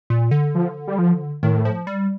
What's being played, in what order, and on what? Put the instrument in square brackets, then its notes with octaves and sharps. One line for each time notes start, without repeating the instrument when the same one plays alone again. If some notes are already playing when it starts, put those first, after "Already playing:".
[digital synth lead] A#2
D3
[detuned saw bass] F3
G3
F3
[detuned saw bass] A2 [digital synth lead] D#3
[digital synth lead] F3
G3